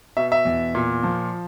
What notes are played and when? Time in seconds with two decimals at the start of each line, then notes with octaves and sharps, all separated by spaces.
0.17 B2 E5
0.32 E5
0.45 E2
0.75 A#2
1.03 F3